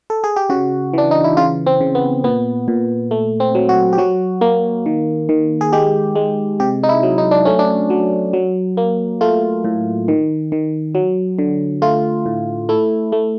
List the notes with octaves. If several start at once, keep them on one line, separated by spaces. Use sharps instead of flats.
A4
G#4
G4
C#3 F#4
E3 D4
D#4
E4
C#3 F4
C4
C#3
B3
A#2 B3
A#2
A3
C4
F#3
F#4
G4
F#3 F#4
A#3
D#3
D#3
G#4
G#3 G4
G#3
C3 G4
D#4
E4
F#3
D#4
D4
A3 C#4
D4
F#3
F#3
A#3
A3 F4
A2
D#3
D#3
F#3
D3
A3 F4
A2
A3 E4
A3